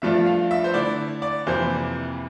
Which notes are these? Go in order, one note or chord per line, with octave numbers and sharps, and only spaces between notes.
G2 F3 A3 D4 F4 E5
F5
E5
C5
D3 A3 E4 D5
D5
F2 C3 E3 A#3 E4 C5